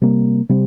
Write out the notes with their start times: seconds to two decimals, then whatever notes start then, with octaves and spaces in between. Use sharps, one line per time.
0.01 C3 G3 A#3
0.49 C3 G3 C4